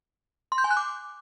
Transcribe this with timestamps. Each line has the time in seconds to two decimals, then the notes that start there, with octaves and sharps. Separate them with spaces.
0.52 C6
0.58 G6
0.64 G#5
0.70 F#6
0.77 D6